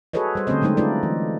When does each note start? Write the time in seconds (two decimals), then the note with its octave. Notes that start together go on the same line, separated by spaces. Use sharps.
0.13 F#4 G#4 A4 B4 C#5 D#5
0.35 G3 C5
0.47 D3 A3 C4 C#4 C5 D#5
0.62 D3 F#3 G#3 A3 D#4 C5
0.77 A3 D#4 F4 A4 B4 D5
1.03 E3